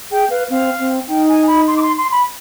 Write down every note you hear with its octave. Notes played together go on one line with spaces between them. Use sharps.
G#4 G5
B4 F5
C4 F5
C4
D#4 G5
G#5
B5
C6
D6
C6
C6
B5